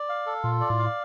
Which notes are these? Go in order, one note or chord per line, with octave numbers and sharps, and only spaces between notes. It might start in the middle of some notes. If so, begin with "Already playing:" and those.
Already playing: D5
F5
A4
A#2 F4
D5
A2
F5